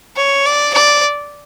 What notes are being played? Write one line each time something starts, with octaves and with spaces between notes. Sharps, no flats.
C#5
D5
D5